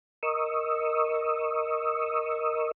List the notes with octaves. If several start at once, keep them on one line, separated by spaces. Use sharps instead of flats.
A#4 D#5 C#6 D#6 E6